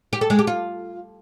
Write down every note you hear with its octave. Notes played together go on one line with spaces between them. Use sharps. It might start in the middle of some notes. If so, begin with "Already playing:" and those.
G4
A4
G#3
G4
F4